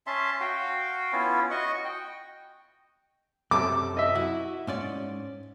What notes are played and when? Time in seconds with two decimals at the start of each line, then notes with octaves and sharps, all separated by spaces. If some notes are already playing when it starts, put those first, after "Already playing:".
0.07 C#4 E5 A5 C6
0.41 F#4 F5 G5
1.12 B3 C#4 E4 F4
1.51 F#4 D#5 F#5 C#6
1.84 G5
3.51 F#2 C3 A4 D6
3.97 D#5 E5
4.15 E4 F#4
4.67 G#2 C#4 D5